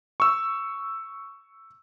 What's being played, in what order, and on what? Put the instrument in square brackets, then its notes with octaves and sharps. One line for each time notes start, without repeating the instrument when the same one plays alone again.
[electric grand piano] C#6 E6